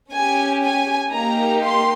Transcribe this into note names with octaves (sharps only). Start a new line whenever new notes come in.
C#4 G4 G#5
G#5
A#3 D#4 G4 A#5
C6